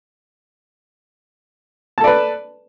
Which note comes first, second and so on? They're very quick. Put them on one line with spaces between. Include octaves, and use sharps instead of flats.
A5 A4 D5 B4